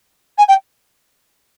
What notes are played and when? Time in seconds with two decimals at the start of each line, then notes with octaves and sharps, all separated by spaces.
0.38 G#5
0.48 G5